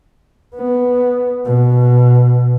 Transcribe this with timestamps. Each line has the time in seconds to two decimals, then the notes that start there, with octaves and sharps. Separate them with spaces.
0.56 B3
1.45 B2